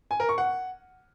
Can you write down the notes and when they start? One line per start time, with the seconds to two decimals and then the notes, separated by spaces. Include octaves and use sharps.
0.11 G#5
0.20 A#4
0.29 C#6
0.38 F#5